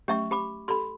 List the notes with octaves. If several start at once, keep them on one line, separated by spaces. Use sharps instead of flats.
F#3 A3 C#4 G4 E5 C#6
G4 B5 D6
G4 A4 B5 C6